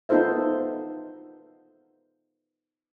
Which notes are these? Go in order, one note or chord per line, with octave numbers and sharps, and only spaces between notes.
B3 D#4 F4 A4 C5 E5